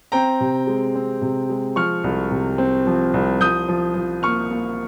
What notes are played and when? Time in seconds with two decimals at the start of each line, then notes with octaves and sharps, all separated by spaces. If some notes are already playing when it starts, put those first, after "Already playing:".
0.12 C4 G5 A#5
0.40 C3
0.67 G#3
0.95 C4
1.21 C3
1.50 G#3
1.76 F3 C#6 F6
2.04 C2
2.31 C3
2.58 C4
2.87 F3
3.14 C2
3.40 F3 D#6 G6
3.68 F3
3.95 F3
4.23 A#3 C#6 F6
4.50 A#3